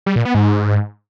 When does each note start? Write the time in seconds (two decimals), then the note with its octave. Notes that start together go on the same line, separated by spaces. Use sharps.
0.06 G3
0.16 A#2
0.25 B3
0.35 G#2